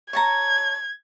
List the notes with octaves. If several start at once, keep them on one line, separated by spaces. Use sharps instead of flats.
C#5 A5 A#5 G#6